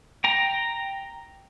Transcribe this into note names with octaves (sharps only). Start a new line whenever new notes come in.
G5 A#5